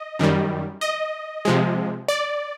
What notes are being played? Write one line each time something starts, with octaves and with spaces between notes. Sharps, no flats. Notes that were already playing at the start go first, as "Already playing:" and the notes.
Already playing: D#5
F#2 D#3 G3
D#5
C3 F3 G#3
D5